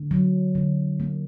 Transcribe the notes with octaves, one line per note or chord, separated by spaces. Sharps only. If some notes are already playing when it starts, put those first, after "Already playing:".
Already playing: D3
F#3
D3
A#3